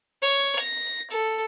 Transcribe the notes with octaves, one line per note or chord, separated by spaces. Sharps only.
C#5
A#6
A4